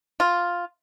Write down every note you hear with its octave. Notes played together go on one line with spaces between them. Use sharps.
F4